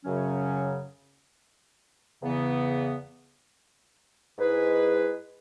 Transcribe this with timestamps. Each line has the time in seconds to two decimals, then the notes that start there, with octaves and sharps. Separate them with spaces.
0.04 F#2 C#3 F#3 C#4
2.23 E2 C#3 E3 B3
4.39 G#2 G#3 E4 G#4 B4